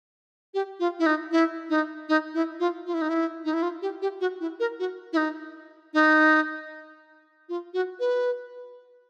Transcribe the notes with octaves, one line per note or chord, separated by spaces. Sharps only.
G4
F4
E4
D#4
E4
D#4
D#4
E4
F4
F4
E4
D#4
E4
D#4
E4
F4
G4
G4
F#4
E4
A#4
F#4
E4
D#4
D#4
F4
F#4
B4